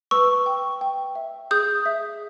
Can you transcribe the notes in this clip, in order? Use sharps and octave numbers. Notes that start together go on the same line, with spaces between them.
B4 C#6 E6
G5
G5
E5
G#4 D#6 G6
E5